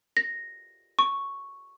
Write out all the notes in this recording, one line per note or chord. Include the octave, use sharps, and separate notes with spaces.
A#6
C#6